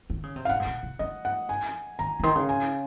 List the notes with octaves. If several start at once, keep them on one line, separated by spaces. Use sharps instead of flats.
D#3
C#3
C3
F5
A#2 F#5
G#2
A#2
C3
F3 D#5
F#5
G#5
D#3 A#5
C#3
D#3 C6
C#3
G#5